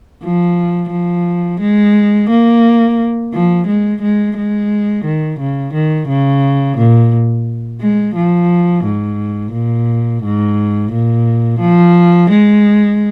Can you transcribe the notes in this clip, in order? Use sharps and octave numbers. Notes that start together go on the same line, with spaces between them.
F3
F3
G#3
A#3
F3
G#3
G#3
G#3
D#3
C#3
D#3
C#3
A#2
G#3
F3
G#2
A#2
G#2
A#2
F3
G#3